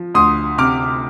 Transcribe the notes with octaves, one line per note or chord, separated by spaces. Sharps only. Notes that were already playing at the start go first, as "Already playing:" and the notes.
Already playing: F3
D2 C6 D#6
C3 D6 F6